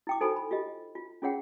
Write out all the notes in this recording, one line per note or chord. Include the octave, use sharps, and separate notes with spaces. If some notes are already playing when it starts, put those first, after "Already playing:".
E4 G5 D6
D#4 F#4 A4 C5 G#5 B5
B5
F4 G4 D#5
F4
C#4 F4 G#4 C#5 F#5 G5